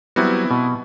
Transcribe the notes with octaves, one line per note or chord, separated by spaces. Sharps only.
F#3 G3 B3 C4 E4 F#4
B2